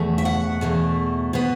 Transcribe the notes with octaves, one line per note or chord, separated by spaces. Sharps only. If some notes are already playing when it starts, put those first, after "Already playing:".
Already playing: E2 B2 A3
E5
F#5
E2 B2 A3
B2 B3